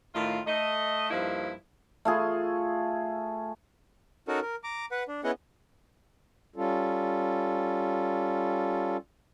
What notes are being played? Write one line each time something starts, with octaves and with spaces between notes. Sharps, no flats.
A2 D#3 F4
A3 D#5
G2 F3 A#3 D#4 E4
A3 F4 G#4
C#4 D#4 F#4 A4 A#4
A#4
A#5 D6
B4 F#5
D4
B3 C#4 E4 G#4 D#5 F#5
G3 C#4 F4 A4